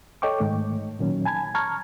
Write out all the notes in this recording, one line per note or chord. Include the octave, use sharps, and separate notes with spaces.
A4 C#5 D#5 G5 C#6 D6
G#2 D#3 A3
A#2 D#3 F#3 C#4
G#5 A5 B5 G#6
A5 A#5 C#6 F6 G#6